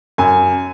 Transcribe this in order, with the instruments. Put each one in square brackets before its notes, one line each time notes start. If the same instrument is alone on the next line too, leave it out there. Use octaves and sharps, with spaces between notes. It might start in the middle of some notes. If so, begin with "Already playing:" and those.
[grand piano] F#2 G#5